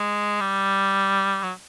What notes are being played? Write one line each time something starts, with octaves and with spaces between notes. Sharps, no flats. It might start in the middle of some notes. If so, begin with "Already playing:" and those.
Already playing: G#3
G3
F#3